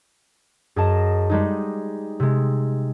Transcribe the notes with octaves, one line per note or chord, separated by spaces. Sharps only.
F#2 G#4 D#5 A5 A#6 E7
G3 G#3 D#4
C3 G#3